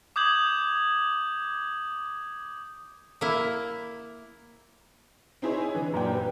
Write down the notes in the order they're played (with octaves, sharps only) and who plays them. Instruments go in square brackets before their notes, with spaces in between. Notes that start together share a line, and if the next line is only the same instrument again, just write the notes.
[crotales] D6 D#6 G6 G#6 F#7
[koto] A#3 E4
[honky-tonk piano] C4 D#4 E4 G#4 C5 C#5
G#5
D3 E3
F#2 A#2 D4 G5
G4 B4